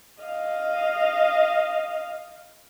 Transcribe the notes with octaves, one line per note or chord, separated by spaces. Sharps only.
D#5 F5